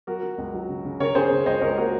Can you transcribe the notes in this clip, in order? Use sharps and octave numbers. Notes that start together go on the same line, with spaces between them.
F#3 F#4 A#4
F#3
C#2
F#3
C#3
C#3
C#3 A#4 C#5
C#3 G#4 C5
C#3
C#2 C5 D#5
C#2 A#4 C#5
C5
A#3 F#4 A#4